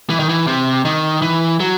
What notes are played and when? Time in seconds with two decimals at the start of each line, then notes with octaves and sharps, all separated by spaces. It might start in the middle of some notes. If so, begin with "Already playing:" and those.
0.10 E3
0.20 D#3
0.29 E3
0.47 C3
0.85 D#3
1.22 E3
1.60 F#3